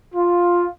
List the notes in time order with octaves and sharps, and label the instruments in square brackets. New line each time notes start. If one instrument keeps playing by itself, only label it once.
[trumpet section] F4